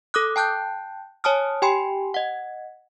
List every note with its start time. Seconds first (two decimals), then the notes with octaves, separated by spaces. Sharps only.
0.14 A4 D6 D#6 F#6
0.36 G5 A5 F#6 G6
1.24 C#5 G#5 A5 D#6 F6
1.62 G4 G5 G#5 B5 C6
2.14 D#5 F#5